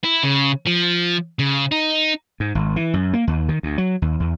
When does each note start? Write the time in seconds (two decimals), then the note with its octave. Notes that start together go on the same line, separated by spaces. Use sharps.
0.04 E4
0.23 C#3
0.67 F3
1.39 C#3
1.71 D#4
2.40 G#2
2.55 G#1
2.76 E3
2.94 F#2
3.13 A#3
3.27 D#2
3.49 D#3
3.63 D2
3.78 F#3
4.02 D#2
4.20 E2